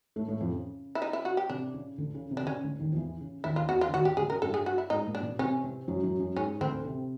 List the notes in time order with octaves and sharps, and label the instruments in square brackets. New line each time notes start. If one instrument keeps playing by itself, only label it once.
[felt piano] A2 A3
A2 A3
F2 F3
C#3
[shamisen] E4
D#4
E4
F#4
G4
[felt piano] C3 [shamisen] D4
[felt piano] C#3
D2 D3
C#3
C3
[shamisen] D4
[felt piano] D3
[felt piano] C#3 [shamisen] C#4
[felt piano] D2 D3
D#2 D#3
F3
E2 E3
C#3
[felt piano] D#2 D#3 [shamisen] E4
[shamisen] F4
[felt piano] E2 E3 [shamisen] F#4
[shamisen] F4
[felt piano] D3
[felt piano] D#2 D#3 [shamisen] F#4
[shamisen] G4
[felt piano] D2 D3 [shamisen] G#4
[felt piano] C#3 [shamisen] A#4
[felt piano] G2 G3 [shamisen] A4
[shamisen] G#4
F#4
E4
[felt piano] G#2 G#3 [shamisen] D#4
[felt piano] A#2 A#3
[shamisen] D4
[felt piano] B2 B3
[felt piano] C3 C4 [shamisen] C#4
[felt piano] C3 C4
F#2 F#3
F#2 F#3
F#2 F#3
[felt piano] G#2 G#3 [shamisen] C#4
[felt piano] D2 D3 [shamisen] C4
[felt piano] C3